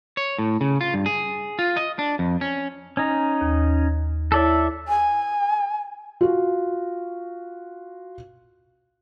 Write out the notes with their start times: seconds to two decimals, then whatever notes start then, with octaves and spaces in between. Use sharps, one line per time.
0.17 C#5
0.39 A2
0.61 C#3
0.81 F4
0.94 G2
1.06 G#4
1.59 F4
1.77 D#5
1.99 D4
2.19 F2
2.41 C#4
2.97 C#4 D#4
3.41 D#2
4.32 E4 A4 C#5 D5 E5
4.88 G#5
6.21 F4 F#4